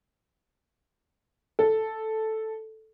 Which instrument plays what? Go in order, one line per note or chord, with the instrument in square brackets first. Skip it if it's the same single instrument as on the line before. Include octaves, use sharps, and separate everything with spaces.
[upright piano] A4